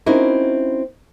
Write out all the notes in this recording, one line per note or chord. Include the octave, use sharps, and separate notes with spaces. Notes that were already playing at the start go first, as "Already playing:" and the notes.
C4 C#4 D#4 E4 F#4 A#4